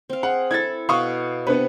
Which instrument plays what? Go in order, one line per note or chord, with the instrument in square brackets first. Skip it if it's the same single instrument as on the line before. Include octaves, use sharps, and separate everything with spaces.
[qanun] C4 F5
[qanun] G#4 [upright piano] F#5
[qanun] E4 A4 [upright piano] G#6 A6
[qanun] B2 B3 B4 [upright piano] F5 C#6 D#6
[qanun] C3 [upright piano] B3 D4 B4